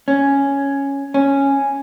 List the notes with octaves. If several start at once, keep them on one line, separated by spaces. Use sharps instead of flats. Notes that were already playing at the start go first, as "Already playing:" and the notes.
C#4
C#4